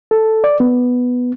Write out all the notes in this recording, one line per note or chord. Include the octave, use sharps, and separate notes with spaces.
A4
D5
B3